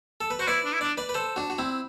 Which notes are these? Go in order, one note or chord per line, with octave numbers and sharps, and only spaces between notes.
A4
B4
F#4 C5
E4 B4 D5
D4
E4
D4 D5
B4 D5
B4
A4 C5
D4 F#4
F#4
C4 E4